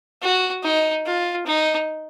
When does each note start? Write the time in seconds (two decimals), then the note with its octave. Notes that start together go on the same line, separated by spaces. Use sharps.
0.22 F#4
0.64 D#4
1.06 F4
1.46 D#4